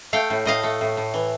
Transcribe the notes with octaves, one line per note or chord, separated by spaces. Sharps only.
A3 F5 G5
A2
A2 D#5 F5
A3
A2
A2
E3